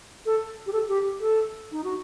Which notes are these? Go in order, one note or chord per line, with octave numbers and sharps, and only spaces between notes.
A4
G4
A4
G4
A4
D#4
F#4